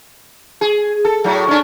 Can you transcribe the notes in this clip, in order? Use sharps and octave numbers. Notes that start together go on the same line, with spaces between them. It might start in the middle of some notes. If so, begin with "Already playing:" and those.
G#4
A4
A2 F#3
C#4 D4